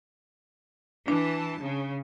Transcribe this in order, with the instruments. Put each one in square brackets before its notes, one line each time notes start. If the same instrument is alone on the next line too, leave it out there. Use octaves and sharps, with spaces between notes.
[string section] E3 A5 [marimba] D4
[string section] C#3